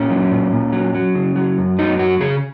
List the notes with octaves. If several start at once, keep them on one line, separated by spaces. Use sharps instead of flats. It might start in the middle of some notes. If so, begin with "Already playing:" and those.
Already playing: A#2 C#4
F#3
A#2
A#2
F#3
F#3
C#3
F#3
F#2
F#3 D#4
F#2 F#4
C#3 G#4